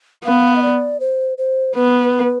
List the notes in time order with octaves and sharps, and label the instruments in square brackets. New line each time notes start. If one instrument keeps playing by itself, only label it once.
[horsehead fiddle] B3 [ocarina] F5
[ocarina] D#5
D5
C5
C5
[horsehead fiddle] B3 [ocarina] B4